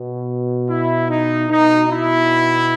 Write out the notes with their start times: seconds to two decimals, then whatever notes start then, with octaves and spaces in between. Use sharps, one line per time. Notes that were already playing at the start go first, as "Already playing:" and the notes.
Already playing: B2
0.67 E4
1.08 D#4
1.49 B2 D#4
1.89 E4